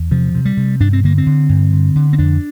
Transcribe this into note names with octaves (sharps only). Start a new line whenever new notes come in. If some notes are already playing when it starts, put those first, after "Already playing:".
Already playing: E2
C3 F3
C3
G3
C3
G2 D4
C4
D3 A#3
C4
D3
G2
D3
D3
C4
F2 D4